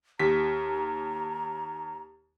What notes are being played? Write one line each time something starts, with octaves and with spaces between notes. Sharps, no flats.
D#2 G4 A#5 B6